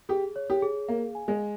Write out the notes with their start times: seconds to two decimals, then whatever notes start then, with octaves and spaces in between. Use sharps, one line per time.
0.09 G4 G#4
0.36 C#5
0.50 G4
0.62 G#4
0.88 A#3 F5
1.15 G#5
1.28 G#3